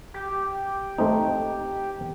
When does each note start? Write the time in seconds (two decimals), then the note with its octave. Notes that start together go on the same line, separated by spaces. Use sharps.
0.14 G4
0.98 A3 C4 D#4